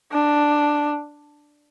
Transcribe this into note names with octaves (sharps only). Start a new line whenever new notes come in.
D4